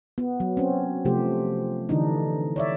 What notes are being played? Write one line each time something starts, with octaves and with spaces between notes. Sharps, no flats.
B3
F#3
C4 C#4
C3 F3 A3 G4 C5
D3 E3 D4 D#4
C#5 D5 E5